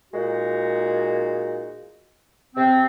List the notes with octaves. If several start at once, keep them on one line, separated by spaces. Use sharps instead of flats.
A#2 G#3 D#4 F#4
C3 C4